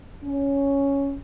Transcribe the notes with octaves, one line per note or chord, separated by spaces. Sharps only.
C#4